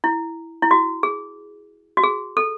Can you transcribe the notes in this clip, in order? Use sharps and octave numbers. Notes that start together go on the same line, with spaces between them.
E4
E4
F#4
G#4
F#4
G#4
A4